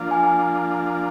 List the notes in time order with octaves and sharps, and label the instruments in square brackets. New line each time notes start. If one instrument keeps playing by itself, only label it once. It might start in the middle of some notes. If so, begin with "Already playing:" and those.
Already playing: [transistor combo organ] F3 A#3 D4 F4
[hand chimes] G#5